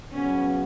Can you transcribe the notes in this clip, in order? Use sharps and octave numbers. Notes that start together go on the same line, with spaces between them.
C#3 F#3 B3 C#4